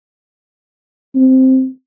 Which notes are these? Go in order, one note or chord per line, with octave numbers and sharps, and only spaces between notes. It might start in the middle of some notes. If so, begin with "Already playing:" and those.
C4